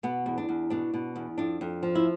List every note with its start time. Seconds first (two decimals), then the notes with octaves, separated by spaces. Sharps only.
0.03 B2 B3
0.26 E2
0.38 D4
0.49 E2
0.70 B2 D4
0.94 B2
1.16 E2
1.38 F2 D4
1.61 F2
1.83 F3
1.95 E4